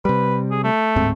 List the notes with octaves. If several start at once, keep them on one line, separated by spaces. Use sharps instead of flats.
C3 G3 B4
G#4
A3
D1 G#2 C4